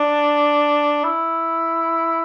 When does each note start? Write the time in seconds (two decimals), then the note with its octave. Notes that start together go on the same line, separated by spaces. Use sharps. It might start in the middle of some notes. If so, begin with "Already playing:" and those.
Already playing: D4
1.04 E4